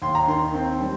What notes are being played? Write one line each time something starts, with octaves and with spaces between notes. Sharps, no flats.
D#2 C6
A#5
D#3 C6
C4
G3